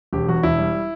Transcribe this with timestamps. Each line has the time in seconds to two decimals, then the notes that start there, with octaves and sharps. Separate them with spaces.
0.13 E1 G4
0.28 E2 F#4
0.43 E1 E4
0.58 G3